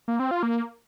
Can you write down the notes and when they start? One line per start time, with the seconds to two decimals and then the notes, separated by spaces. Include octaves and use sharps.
0.08 A#3
0.19 C4
0.31 F4
0.43 A#3